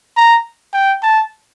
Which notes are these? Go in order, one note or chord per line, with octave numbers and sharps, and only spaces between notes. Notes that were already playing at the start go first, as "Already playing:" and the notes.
A#5
G5
A5